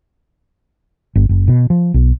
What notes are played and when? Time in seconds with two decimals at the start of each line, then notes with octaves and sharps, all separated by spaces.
1.16 G1
1.29 F#1
1.48 B2
1.70 F3
1.94 B1